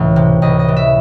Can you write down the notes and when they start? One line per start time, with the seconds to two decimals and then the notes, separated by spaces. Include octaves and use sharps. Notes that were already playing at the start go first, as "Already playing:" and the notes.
Already playing: C#2 A2 E3 A3
0.16 C3
0.42 C#2 D#5
0.59 D#5
0.68 E3
0.76 E5